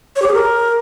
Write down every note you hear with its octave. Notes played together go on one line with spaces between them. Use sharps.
C#5
G4
G#4
A#4